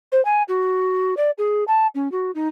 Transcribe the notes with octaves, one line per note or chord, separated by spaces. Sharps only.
C5
G#5
F#4
D5
G#4
A5
C#4
F#4
D#4